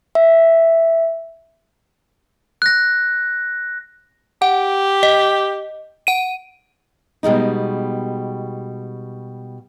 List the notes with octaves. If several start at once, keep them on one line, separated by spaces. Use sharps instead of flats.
E5
F#6 A#6
G4 F#5
D#5
F#5 D#7
B2 G3 G#3 D#4